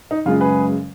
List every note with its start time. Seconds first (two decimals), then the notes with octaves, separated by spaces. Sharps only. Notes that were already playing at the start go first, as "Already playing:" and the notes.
0.11 D#4
0.26 F#2 C#3 G#3 F4
0.41 G#4 B4